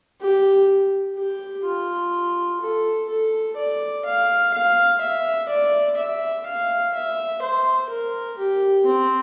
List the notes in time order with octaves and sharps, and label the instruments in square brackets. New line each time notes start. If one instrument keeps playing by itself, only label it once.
[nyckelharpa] G4
G4
F4
A4
A4
D5
F5
F5
E5
D5
E5
F5
E5
C5
A#4
G4
C4